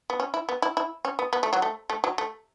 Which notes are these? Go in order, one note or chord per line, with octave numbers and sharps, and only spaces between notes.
B3
C#4
E4
B3
E4
E4
C#4
B3
B3
A3
F#3
A3
A3
F#3
A3